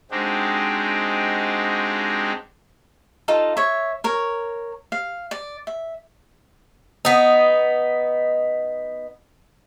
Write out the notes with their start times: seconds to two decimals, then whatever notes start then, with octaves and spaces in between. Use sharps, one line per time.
0.11 G#3 C4 D4 D#4 F#4 G4
3.28 D#4 F4 A4 F5
3.57 C#5 E5
4.04 A#4 C#5
4.92 F5
5.31 D5
5.67 E5
7.05 B3 D#4